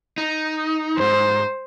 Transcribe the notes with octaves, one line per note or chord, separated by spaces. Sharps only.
D#4
E2 G#2 C5